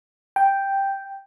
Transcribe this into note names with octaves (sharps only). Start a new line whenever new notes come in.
G5